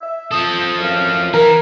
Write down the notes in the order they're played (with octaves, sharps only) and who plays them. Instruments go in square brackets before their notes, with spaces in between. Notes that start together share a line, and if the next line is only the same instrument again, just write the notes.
[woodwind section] E5
[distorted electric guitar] F3 A4 [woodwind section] D#6
[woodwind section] F#2 A2 F5
[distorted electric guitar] E3 [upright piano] A#4